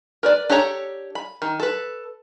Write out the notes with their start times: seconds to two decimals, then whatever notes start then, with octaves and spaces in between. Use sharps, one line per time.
0.23 A#4 B4 D5
0.49 D4 G4 A4 C#5 A#5
1.15 B5
1.42 D#3
1.60 A4 B4